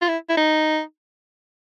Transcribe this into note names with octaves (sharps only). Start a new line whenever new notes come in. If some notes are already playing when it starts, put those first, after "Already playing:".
F4
E4
E4
D#4